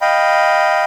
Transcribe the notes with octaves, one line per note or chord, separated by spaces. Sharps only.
D#5 F5 G5 B5